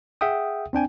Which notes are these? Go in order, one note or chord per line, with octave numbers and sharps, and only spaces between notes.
G#4 E5 F#5 G5 D#6
C4 D4 G5 G#5